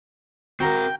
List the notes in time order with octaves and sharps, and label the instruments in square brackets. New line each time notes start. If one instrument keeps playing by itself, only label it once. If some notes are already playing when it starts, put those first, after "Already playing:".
[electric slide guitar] C4 A#4 [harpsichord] F#4 A#5 [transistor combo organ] G5